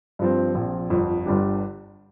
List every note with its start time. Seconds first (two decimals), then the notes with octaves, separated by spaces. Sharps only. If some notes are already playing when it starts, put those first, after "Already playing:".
0.19 G2 F3 C4
0.54 A#1 A#2 F3 C4
0.90 G1 F2 F3
1.26 G1 G2 G3 D4 G4